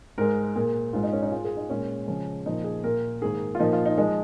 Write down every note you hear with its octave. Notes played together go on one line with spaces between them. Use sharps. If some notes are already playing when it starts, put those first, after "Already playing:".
G#2 G#3 A#4
A#2 A#3 G#4
G#2 G#3 F4
D#4
C#4
D#4
G#2 G#3 F4
G#4
D#4
A#2 G#3 C#4
C#3 F3 G#3 C#4
A#2 F3 A#3 D#4
G#4
A#2 A#3 A#4
G#2 D#3 A#3 G#4
F4
A#2 F3 A#3 D#4
F4
D#4
F3 G#3 D#4